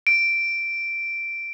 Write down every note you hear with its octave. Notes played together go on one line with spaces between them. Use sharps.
D7